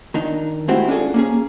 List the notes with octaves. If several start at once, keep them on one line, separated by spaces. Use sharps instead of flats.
D#3 D4 D#4
G#3 A3 C4 E4 F#4 G4
C#4 D4 F4 G#4 A4
A#3 C#4 G#4